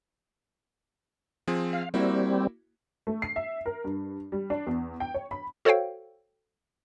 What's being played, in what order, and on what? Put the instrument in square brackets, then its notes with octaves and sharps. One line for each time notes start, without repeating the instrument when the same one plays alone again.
[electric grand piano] F3 C4 G#4
[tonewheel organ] F5
[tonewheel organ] G3 C4 [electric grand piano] A#3 E4 F#4
[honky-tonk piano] A3
C7
E5
A#4
G2
G3
D4
E2
G5
C#5
B5
[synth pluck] F#4 A4 C5 C#5 F5 G5